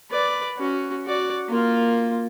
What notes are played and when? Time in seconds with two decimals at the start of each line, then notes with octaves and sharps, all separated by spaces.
0.11 B4 D5
0.58 C#4 F#4
1.06 F#4 D5
1.49 A#3 F4